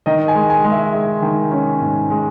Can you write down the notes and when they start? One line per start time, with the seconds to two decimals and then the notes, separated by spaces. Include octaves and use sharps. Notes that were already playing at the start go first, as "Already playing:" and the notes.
0.06 D#3 D#5
0.28 G#5
0.35 G#3
0.50 G#5
0.64 G#3
0.72 E5
0.93 G#3
1.22 D#3
1.51 C#4
1.81 G#2
2.10 G#3